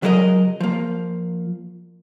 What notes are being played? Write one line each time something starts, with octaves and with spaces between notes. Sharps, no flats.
C#2 F#3 G#3 F#4 A#4 D#5
F3 A#3